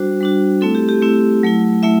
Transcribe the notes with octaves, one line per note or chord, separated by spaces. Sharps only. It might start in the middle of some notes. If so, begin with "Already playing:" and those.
Already playing: G3 D4 F#4 C5
G3 D4 F#4
A3 C4 E4 A4
G4
G4
A3 C4 E4
F#3 A3 E4
A3 E4 E5